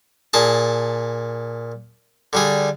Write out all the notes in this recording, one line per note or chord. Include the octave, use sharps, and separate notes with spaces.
A#2 G#4 A5
D3 G3 G#4